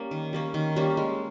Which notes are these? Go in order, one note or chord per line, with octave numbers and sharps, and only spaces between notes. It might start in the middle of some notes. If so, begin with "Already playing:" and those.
Already playing: G3 A#3 C#4
D#3
G3 A#3 C#4
D#3
G3 A#3 C#4
G#3